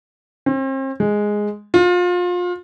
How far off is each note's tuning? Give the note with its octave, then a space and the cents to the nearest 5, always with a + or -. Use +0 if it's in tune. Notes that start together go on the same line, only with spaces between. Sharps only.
C4 +40
G#3 +0
F4 +30